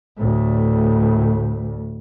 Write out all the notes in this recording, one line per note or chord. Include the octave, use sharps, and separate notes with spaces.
D2 A2